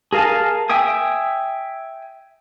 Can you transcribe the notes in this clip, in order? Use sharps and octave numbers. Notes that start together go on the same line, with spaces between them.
G#4 A#4 F5 G#5 A5
E5 G5 G#5 D#6